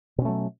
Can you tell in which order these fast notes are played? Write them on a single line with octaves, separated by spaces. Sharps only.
B2 C#4 A3 F#3